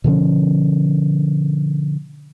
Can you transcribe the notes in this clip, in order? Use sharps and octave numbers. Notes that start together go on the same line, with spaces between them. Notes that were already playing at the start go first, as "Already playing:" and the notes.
B2 D3 F3 C#4